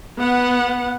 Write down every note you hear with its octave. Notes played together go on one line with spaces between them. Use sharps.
B3 F#5